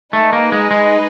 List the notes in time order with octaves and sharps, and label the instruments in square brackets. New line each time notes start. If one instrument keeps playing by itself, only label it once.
[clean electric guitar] A3 [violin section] D#4 G#4 B4 D#5
[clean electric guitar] A#3
G#3
G#3